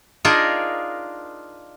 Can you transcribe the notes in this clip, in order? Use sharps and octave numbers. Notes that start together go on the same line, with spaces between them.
D4 D#4 F4 G#4 A#4